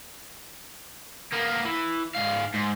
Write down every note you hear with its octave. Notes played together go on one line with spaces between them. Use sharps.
A#3 B3
E3
G#2 F5
G#2